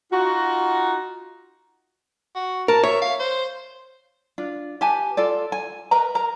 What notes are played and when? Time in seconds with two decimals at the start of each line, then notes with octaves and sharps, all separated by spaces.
0.12 D#4 F4 F#4
2.35 F#4
2.68 A#4 A5
2.84 C#5 E5
3.01 F5
3.19 C5
4.38 D4 F4
4.81 G4 B4 G#5 A5
5.17 F4 A4 D5
5.52 G#5
5.91 A#4 B4 D#5 A#5
6.15 A#4 A#5